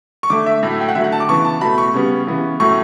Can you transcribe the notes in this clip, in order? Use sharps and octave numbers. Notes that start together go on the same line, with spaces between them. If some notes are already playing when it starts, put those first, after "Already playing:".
C#6
D3 A3 D6
E5
A2 F#3 A3
G5
F#5
D3 F#3 A3 E5
F#5
A5
D6
C#3 E3 B3 C#6
A5
B2 A3 B5
C#6
C#3 G3 B3
C#3 E3 B3
A2 F#3 A3 C#6